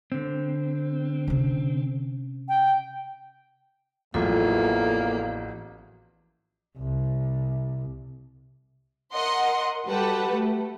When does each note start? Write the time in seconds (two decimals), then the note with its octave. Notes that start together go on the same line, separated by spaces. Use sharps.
0.12 D3 C4
1.28 C3 C#4
2.49 G5
4.14 A1 E2 F3 F#3 A#3 F4 A4 E5
6.78 C2
9.13 A#4 D#5 F#5 C6
9.86 G3 F#4 G4 A4 B4 F#5
10.32 A3